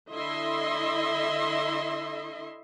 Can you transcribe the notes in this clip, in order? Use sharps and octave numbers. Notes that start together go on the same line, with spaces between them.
D3 E4 D#5 E5 C6